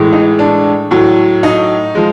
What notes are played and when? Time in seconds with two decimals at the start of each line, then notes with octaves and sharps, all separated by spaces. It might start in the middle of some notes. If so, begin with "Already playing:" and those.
Already playing: A2 E3 G#3
0.13 D#4
0.39 D4
0.91 A2 F#3
1.43 D#4
1.95 F3 G#3